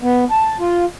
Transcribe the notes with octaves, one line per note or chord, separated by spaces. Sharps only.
B3
A5
F4